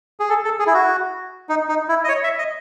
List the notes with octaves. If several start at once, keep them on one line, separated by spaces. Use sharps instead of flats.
G#4
A4
A4
G#4
E4
F#4
D#4
D#4
E4
D#5
C#5
E5
D#5